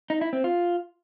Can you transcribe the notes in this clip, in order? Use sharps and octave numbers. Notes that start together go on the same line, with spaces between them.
D#4
E4
C4
F4